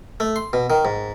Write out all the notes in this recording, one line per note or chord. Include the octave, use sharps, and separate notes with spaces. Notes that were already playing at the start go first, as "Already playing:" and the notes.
A3
C6
B2
D#3
G#2